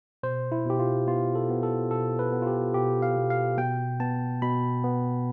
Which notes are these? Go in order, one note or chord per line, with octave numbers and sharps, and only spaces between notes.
B2 C5
E4
B2 G4
F4
B3 F4
A4
B3
A4
B2 A4
B4
B3
F4
G4
B2 G4
F5
B2
F5
B2 G5
B3 A5
B2 B5
B3